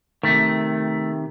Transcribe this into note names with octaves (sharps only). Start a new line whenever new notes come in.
C3 D#3 A3